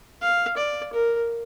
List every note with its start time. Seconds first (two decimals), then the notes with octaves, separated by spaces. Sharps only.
0.22 F5
0.57 D5
0.93 A#4